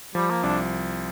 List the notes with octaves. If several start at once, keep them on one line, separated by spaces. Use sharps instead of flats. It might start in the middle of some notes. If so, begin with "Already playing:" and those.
F3 G3
A#3
C2 D4